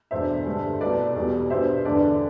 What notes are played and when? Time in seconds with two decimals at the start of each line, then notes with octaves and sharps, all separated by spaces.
0.11 E2 B2 A3 D4 C5 E5
0.46 G2 D3 A3
0.81 C2 B2 A3 B4 D5
1.15 E2 B2 G3
1.50 B2 G3 B3 D4 C5 E5
1.85 E2 D3 A3 D4 B4 D5